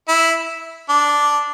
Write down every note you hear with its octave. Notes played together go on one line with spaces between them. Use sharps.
E4
D4